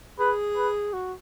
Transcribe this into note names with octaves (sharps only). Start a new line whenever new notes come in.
G#4 B4
B4
F#4